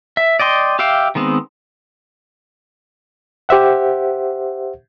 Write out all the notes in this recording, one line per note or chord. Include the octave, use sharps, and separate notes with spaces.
E5
D5 D#5 G5 C6
G4 E5 F5 G5
D#3 G#3 B3 C4
G4 C5 E5 F#5